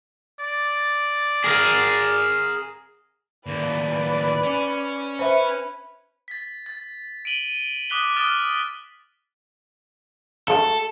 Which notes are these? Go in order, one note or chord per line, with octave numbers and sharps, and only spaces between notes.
D5
G#4 A#4
D#2 A2 B4 D5
C#4
B4 C5 E5
A6 B6
A6
D7 D#7 F#7 G7
D6 D#6 F#6 B6 G7
D6 D#6 F6 A6 D7
G#3 A3 F#4 A4